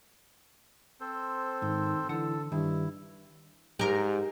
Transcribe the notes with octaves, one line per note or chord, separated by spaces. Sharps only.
C4 A4 C5
G#2 D#3
D3 E3 A4 F#5
G2 D#3 E4
G#2 G4 A#4